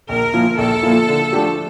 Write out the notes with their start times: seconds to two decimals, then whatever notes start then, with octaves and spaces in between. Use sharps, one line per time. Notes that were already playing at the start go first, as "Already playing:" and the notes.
0.09 A#1 A#4
0.33 A#2 F3 A#3 E4
0.58 A#1 A4
0.83 A#2 F3 A#3 E4
1.08 D3
1.32 F3 A3 D4 G4